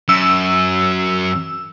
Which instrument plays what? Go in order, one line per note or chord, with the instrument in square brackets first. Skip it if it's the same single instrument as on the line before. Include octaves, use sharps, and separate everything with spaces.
[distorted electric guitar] F#2 [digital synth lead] E6